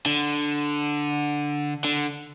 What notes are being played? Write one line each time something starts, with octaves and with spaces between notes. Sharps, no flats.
D3
D3